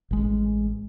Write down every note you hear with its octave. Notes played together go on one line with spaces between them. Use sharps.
A1 G#3